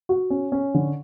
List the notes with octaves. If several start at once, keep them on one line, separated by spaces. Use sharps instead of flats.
F#4
C#4
C#4
D3